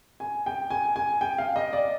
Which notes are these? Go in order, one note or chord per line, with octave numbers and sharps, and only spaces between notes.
G#5
G5
G#5
G#5
G5
F5
D#5
D5